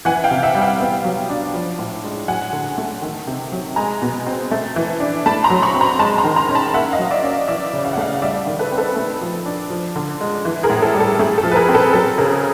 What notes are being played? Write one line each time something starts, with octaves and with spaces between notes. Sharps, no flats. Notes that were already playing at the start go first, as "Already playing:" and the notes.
E3 F#5 G#5
F5 G5
C3
E5 F#5
G3
F5 G5
B3
F#3
D4
F3
A2
G#3
F#3 F#5 G#5
D3
A3
D#3
C3
F#3
G#3 G#5 A#5
B2
C4
A3
E3
D4
A3 A5 B5
A#5 C6
F#3
B5 C#6
C4
A#5 C6
G#3 A5 B5
A#5 C6
D#3
A#5 C6
C#4
A5 B5
A#3 E5 F#5
D#5 F5
F#3
D5 E5
C#4
E3 D5 E5
C#3
F5
F#5
A3 D#5 F5
G3 D5 E5
D#3
A4 B4
C4
A4 B4
A3
F3
D4
F3
D3
G#3
E3
G#4 A#4
A2
A4
G3
A4
A3 G#4
A4
F3
B4
G#4 A#4
C4
A4 B4
F#3 A4
C#3 G#4 A#4